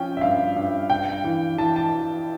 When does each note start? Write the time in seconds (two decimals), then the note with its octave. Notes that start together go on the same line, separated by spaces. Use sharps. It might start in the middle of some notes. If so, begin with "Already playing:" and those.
Already playing: F3 C#4 G5
0.17 E5
0.21 G2 F5
0.56 G2
0.90 G2 G5
1.24 E3
1.58 E3 A5
1.76 A5